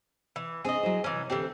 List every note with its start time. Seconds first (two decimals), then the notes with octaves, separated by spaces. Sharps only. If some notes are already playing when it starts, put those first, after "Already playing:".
0.36 E3
0.65 C4 D4 G#4 D#5
0.83 F#3 E4 C5
1.04 C3 E3 C#4
1.30 D2 E3 C4 G4 A4